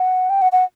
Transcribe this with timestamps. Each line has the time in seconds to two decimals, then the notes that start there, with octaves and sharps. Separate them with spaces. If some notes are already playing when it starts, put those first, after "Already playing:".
Already playing: F#5
0.30 G5
0.42 F#5
0.52 F#5